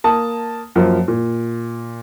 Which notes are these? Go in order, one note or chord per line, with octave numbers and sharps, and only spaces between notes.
A#3 A5 D#6
F#2 F3 A#3
A#2